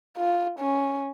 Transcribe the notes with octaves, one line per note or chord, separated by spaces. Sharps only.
F4
C#4